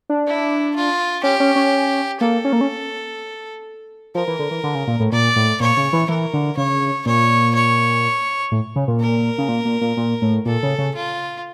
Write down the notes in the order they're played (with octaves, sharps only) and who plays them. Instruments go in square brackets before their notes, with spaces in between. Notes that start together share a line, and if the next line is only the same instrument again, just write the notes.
[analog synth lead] D4
[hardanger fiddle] E4
F4
[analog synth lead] C#4 [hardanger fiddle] G4
[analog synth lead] C#4
C#4
[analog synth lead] A#3 [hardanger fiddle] A4
[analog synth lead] C#4
A#3
C#4
[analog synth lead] F3 [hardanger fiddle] A#4
[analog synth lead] E3
D3
E3
D3
C#3
A#2
A2
[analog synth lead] A#2 [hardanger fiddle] D5
[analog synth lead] A2
[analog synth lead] A#2 [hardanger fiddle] C#5
[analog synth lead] C#3
E3
[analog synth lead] E3 [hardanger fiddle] A#4
[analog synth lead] D3
[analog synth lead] C#3 [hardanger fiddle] C#5
[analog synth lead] A#2 [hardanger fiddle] C#5
[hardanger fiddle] C#5
[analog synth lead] A2
C#3
A#2
[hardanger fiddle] A#4
[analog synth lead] C#3
A#2
A#2
A#2
A#2
A2
[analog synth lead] A#2 [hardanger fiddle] A4
[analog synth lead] C#3
C#3
[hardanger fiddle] F4